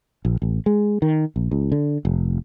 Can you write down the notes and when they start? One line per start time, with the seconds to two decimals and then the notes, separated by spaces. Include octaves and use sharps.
0.25 A#1
0.42 A1
0.66 G#3
1.02 D#3
1.36 A#1
1.51 C#2
1.72 D3
2.05 F1